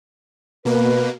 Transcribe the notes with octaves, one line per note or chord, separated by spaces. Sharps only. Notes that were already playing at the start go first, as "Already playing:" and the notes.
B2 A#3 B4